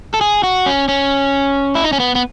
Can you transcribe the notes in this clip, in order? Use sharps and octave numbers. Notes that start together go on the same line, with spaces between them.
A4
G#4
F#4
C#4
C#4
E4
D#4
C#4
B3
B3